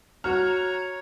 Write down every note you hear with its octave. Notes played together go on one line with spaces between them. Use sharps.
F#4 C#5 A#5 F6